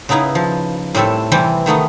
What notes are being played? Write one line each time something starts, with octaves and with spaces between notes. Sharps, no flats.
C#3 B3 D#4 E4 B4
F3
A2 G3 C4 A4 E5
C3 E3 G3 C4
D#3 A3 B3 D#4